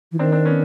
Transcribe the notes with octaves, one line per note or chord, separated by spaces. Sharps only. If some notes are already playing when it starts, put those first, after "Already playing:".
E3
D#3 C4 D4
C4 D4
B3 C#4